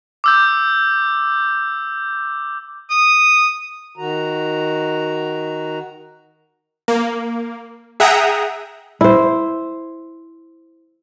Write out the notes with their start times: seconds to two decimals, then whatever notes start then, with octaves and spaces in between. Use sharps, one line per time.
0.24 D6 E6 G6
2.90 D#6
3.98 D#3 F#4 A#5
6.88 A#3
8.00 G#4 E5 F#5 G5 A#5 D#6
9.01 E4 C5